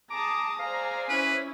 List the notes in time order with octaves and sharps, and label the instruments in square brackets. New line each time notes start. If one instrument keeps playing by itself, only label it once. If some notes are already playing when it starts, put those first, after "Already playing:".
[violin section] G#4 A5 [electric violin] A#5 D#6 [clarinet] D6
[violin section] G#4 C5 D5 [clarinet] F5 [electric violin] A#5
[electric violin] C#4 E4 [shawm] B4